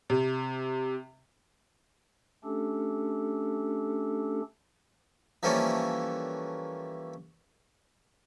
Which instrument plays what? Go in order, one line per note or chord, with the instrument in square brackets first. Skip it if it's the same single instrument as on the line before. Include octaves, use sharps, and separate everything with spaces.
[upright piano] C3
[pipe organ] A3 C#4 D4 G4 A4
[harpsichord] E3 F3 G3 A3 A#3 C#4